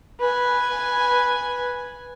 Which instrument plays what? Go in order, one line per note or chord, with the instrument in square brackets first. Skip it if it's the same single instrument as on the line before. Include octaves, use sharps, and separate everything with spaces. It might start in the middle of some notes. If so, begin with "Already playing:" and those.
[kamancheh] B4 G#5